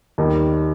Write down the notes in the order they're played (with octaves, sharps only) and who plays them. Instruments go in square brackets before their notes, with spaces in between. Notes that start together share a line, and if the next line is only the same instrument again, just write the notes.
[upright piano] D#2 D#3 G3